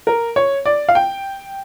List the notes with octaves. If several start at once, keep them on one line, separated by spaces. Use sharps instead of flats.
A#4
C#5
D5
F5
G5